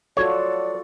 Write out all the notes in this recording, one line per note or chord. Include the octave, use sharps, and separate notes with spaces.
F4 F#4 A4 C#5 D5